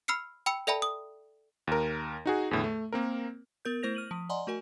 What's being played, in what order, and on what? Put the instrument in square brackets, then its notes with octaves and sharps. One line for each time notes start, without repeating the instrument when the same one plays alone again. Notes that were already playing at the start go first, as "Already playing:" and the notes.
[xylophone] B5 E6 F6 C7 C#7
G5 B5 E6 C#7
A4 D5 E5 G5 A5 B5
D#6
[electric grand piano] D#2 A#4
D#4 F#4 G#4
E2 A2 D3
A3
A#3 C4 A#4
[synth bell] B3 A#4 G6
A3 E4 C5 G6 A#6 F7
F6 D#7 F#7
F3
D5 D#5 F#5 G#5 A#5 C6
A3 F#4 A#4 G#5